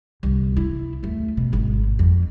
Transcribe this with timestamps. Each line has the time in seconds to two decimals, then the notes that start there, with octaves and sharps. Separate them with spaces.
0.23 C2 D3
0.57 E4
1.03 D#2 A3
1.37 B2
1.53 G#1 G#2
1.99 F2